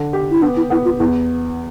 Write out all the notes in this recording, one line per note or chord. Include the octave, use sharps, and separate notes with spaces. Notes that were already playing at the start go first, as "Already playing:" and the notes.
Already playing: D3
G4
E4
B3 D4
E4
B3 E4
F4
E2 E4